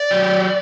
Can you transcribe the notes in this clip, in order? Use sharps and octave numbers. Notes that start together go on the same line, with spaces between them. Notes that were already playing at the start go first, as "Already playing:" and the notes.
Already playing: D5
F#3